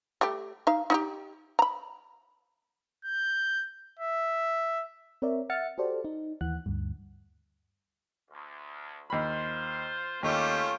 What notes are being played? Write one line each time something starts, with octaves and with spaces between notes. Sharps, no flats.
G3 A3 G4
D#4 F5
D#4 F4 G4
A#5 B5
G6
E5
C4 A#4 C#5 D5 E5
E5 F#5 E6 F6 A6 C#7
F#4 G4 A4 C5 D5
D#4
D#2 E3 F#5 F#6
D2 G2
D2
D#2 F4 C5 B5
D#2 A3 C#4 F4 G4